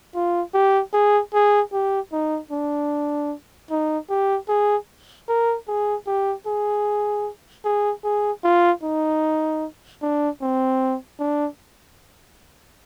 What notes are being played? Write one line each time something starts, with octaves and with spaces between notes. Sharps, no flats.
F4
G4
G#4
G#4
G4
D#4
D4
D#4
G4
G#4
A#4
G#4
G4
G#4
G#4
G#4
F4
D#4
D4
C4
D4